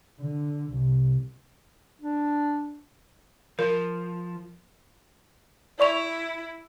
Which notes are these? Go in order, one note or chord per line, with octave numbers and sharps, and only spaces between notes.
D3
C2
D4
F3 A#4
E4 D5 C#6 F7